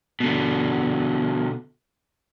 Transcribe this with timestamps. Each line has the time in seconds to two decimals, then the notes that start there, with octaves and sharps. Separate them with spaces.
0.20 B2 D3